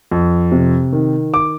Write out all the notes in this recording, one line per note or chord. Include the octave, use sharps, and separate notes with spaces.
F2
C3
D#3
D6